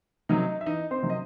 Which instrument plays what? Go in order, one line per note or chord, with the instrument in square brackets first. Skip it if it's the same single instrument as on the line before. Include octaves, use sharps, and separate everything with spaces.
[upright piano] C3 D#3 F#3 D#4 D#5
E5
E2 D#4 D#5
C4 C5
C3 D#3 F#3
D#5